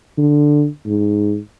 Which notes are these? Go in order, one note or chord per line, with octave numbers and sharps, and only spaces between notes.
D3
G#2